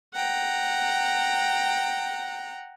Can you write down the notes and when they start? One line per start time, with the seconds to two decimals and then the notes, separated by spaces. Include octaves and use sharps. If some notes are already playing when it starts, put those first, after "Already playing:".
0.14 F#5 G5 A#5